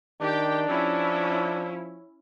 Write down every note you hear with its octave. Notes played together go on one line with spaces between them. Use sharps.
D#3 D4 G4 G5
F3 C#4 E4